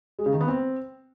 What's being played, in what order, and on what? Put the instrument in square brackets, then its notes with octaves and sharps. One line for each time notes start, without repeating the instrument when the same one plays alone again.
[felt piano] G#3
C#3
D#3
B3
C4